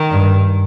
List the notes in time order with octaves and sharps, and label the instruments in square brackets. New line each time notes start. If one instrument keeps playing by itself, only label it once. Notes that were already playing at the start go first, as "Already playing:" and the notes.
Already playing: [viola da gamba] D#3
[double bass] G2